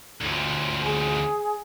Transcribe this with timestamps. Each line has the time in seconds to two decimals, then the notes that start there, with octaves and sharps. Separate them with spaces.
0.21 D2 F3
0.83 G#4